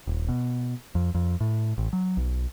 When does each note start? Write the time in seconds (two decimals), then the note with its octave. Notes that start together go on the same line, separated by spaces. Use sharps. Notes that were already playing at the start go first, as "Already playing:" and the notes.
0.07 D#1
0.29 B2
0.95 F2
1.15 F2
1.41 A2
1.78 A1
1.93 F#3
2.17 B1